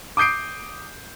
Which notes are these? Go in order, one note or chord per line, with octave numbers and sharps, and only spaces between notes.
D6 D#6 G6 C7 D7